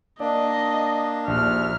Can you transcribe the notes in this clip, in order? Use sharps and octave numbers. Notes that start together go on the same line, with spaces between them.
A#3 D4 D5 D#5
A#1 D#2 F6